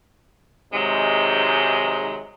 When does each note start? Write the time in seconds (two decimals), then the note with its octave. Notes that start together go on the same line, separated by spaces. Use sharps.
0.73 G#2 C3 D#3 F#3 G#3